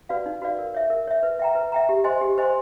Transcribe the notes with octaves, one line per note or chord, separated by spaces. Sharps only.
F#4 B4 D5 F5
D#4
F#4 B4 D5 F5
A#4
C#5 E5
A#4
C#5 E5
B4
E5 G5 A#5
B4
E5 G5 A#5
G4
C5 D#5 G#5 C6
G4
C5 D#5 G#5 C6